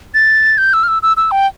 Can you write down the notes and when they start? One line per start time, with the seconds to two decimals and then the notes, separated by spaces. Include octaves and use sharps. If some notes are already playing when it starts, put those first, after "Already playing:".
0.14 A6
0.58 G6
0.74 E6
0.83 F6
0.88 E6
1.03 E6
1.17 E6
1.31 G5